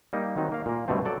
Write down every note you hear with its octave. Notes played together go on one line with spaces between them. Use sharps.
G3 A#3 D#4
D#3 F#3 C4 D#4
A#3 F5
A#2 A#3
G2 B2 D3 A3 C4
F#3 A4 D5